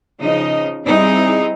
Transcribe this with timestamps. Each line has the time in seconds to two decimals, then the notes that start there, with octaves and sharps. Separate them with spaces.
0.21 C#3 F3 D#4 D#5
0.85 G3 C4 D#4 E4 G#4